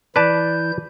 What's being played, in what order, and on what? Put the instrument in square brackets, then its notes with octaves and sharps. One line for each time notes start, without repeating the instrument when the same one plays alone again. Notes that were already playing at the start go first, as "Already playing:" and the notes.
[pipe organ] E3 E4 G6 [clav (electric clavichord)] B4 D5 A5